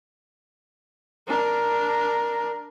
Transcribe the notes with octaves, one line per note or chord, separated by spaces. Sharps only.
D4 A#4